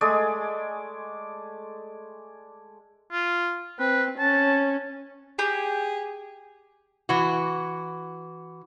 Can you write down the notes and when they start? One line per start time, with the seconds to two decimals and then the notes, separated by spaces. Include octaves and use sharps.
0.01 G#3 A3 G#4 D5
3.12 F4
3.79 C4 B4
4.19 C#4 A5
5.39 G4 G#4
7.09 E3 F#4